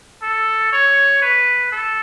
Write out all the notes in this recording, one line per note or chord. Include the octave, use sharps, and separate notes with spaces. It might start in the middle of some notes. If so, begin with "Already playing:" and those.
A4
C#5
B4
A4